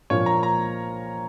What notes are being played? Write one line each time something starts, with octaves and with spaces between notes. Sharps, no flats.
A#2 F3 A#3 F4 C#5
A#5
A#5